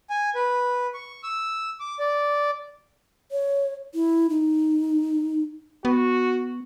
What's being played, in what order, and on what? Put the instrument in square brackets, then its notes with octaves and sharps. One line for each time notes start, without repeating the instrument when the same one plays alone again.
[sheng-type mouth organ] G#5
B4
C#6
E6
D6
D5
[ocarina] C#5
E4
D#4
[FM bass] B3 [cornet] F#4